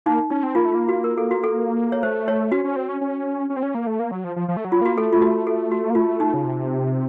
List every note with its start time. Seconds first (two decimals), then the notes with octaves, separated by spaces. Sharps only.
0.06 A#3 D#4
0.30 C#4 D#4
0.43 C4
0.55 A#3 F4
0.65 A3
0.72 A#3 F4
0.89 F#4
1.04 A#4
1.18 A4
1.31 F#4
1.44 A4
1.92 C#5
2.03 A3 C5
2.28 C#5
2.52 C#4 F#4
2.64 C#4
2.76 C4
2.89 C#4
3.01 C#4
3.50 C#4
3.56 C4
3.63 C#4
3.75 A#3
3.87 A3
3.99 A#3
4.11 F#3
4.24 F3
4.36 F3
4.48 F3
4.57 A3
4.65 F#3
4.72 F4
4.81 A#3 F#4
4.98 A3 A4
5.13 F4
5.21 F#4
5.47 A4
5.72 F#4
5.90 A#3
5.95 A3 F4
6.20 D#4
6.34 C#3
6.44 C3